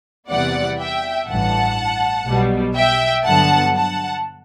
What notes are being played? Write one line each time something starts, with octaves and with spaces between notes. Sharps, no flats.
E2 C3 E3 G3 B3 D5 F#5
E5 G5
A1 G2 E3 F#5 A5
B1 B2 G3 B3
E5 G5
G2 D3 F#3 B3 F#5 A5
F#5 A5